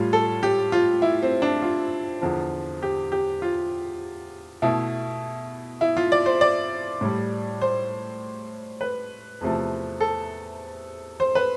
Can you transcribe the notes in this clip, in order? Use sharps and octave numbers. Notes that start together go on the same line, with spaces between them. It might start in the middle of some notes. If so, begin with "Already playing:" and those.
Already playing: A2 G3 F4
A4
G4
F4
E4
C4
D4
F4
E2 D3 F3
G4
G4
F4
B2 A3 E4
E4
F4
D5
C5
D5
A2 G3
C5
B4
E2 C3 F3 A3
A4
C5
B4